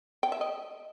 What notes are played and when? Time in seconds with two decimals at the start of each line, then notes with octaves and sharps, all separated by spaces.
0.23 G5
0.32 E5
0.41 D#5